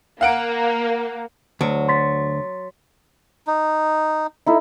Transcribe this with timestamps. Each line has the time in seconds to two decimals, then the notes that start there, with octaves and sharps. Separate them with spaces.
0.21 A#3 F5 F#5 D7
1.61 D2 F#3
1.88 C6 A6 B6
3.47 D#4
4.46 D#4 E4 A4